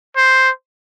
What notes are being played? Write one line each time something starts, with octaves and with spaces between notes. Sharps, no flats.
C5